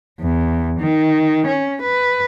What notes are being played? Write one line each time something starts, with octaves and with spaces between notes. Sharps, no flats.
E2
D#3
C#4
B4